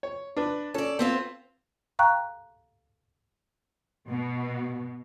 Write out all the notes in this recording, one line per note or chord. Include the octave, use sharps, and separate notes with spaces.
C#5
D4 B4
C#4 A4 D5
B3 C4 F4 C5
F5 G5 A#5 C#6 F#6
B2